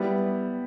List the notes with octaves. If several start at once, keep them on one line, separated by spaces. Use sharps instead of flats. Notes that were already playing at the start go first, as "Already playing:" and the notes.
Already playing: G3 B3 E4